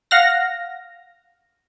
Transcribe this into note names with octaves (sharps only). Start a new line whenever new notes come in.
F5 F#5 F6 A#6